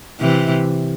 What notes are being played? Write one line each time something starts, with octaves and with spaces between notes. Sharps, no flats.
C3 E3